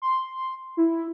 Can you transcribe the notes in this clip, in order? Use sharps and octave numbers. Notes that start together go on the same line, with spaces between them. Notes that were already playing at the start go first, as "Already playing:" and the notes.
C6
E4